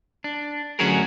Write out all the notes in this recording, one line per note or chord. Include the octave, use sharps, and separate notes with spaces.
D4
D2 F#3 C#4 F#4 G#4 A#4